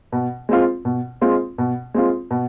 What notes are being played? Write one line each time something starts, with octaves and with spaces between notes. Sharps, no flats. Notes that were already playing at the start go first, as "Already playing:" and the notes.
B2
G#3 C4 F4
B2
G#3 C4 F4
B2
G#3 C4 F4
B2